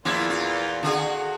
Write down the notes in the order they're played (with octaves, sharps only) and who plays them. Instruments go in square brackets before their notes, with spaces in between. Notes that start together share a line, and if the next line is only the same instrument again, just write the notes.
[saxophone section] E2 A#2 [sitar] F3 A#3 E4
[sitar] F4
D3 F#4 G#4